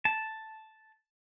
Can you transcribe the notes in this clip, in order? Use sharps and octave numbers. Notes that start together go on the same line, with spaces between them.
A5